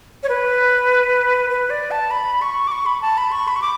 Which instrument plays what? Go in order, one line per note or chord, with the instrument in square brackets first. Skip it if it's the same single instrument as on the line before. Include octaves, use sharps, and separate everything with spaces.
[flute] C#5
B4
B4
D5
A5
B5
C#6
D6
C#6
B5
A5
B5
C#6
B5
C#6
D6